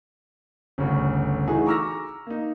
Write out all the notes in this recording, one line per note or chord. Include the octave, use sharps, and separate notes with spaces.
G1 D2 C#3
E3 A3 D#4 F#4 G#4
A#5 C#6 D6 E6 F6 A#6
A#3 D#4